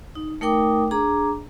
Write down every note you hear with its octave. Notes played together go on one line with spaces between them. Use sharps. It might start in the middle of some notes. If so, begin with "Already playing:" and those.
D#4
A3 D#4 A#4 G5 D6 D#6
D4 G#4 A#5 D6